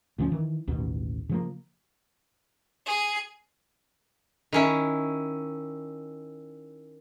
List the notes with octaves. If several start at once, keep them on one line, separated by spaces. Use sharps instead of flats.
D2 D3 F3 C#4
D#3 E3
A1 D#2 B2
C#3 F3 A#3
G#4
D#3 C#4 E4